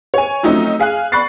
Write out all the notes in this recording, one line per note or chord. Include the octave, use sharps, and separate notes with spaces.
C#5 G#5
F3 F#3 A3 C4 C#4 D#4
G#4 F5 G#5 F#6
D5 B5 C#6 F#6 A6 C7